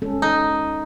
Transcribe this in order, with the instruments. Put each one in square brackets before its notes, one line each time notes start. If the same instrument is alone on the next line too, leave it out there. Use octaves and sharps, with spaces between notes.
[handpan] G#3 C#4 A4
[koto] D#4